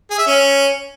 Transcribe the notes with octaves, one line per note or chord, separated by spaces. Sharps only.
G#4
E5
C#4